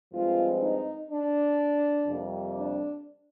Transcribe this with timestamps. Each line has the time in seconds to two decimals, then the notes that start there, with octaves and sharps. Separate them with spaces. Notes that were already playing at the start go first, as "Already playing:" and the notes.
0.12 G2 F3 G#3 C4 F4
0.60 D#4
1.10 D4
2.07 F2 C3 G3 A#3
2.56 D4